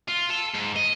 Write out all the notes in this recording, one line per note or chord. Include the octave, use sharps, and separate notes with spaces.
F4
A4
G#2
D#5